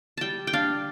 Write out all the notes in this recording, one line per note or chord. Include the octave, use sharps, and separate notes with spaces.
G3 G5 A5
G5
D4 F5